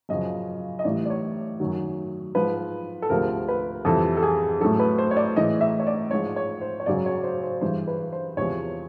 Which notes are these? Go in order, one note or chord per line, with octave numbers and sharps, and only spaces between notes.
F#2 C#3 F3 D#5
D#5
A2 E3 G3 D5
D5
C#5
F#2 D#3 F#3
G#2 F3 G#3 B4
A4
D2 C3 F3 G#3 A#4
B4
F2 C3 E3 G3 A4
A4
G#4
A2 F#3 A4
B4
C5
C#5
D5
A2 E3 G#3 D#5
E5
C#5
D5
G#2 F3 G#3 C#5
C#5
C5
C#5
F#2 C#3 F#3 D5
C#5
C5
C5
G2 E3 G#3 C5
B4
C5
E2 C3 F3 G#3 C#5